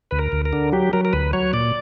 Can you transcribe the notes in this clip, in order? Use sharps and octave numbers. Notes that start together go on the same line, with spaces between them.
D2 B4
A#4
D2
A#4
D3
F#3 G4
F#3 A#4
A#4
D2 B4
F#3 C#5
A#2 D5